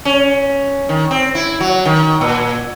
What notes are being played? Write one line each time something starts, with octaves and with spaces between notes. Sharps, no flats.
C#4
D#3
C4
E4
F#3
D#3
A#2